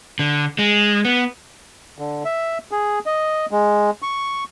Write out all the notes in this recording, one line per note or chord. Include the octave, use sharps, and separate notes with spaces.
D3
G#3
B3
D3
E5
G#4
D#5
G#3
C#6